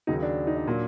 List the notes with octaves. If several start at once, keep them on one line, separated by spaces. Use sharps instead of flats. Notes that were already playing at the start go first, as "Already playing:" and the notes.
D#2 C#3 F#3 D#4
D4
D#4
D4
A#2 F#3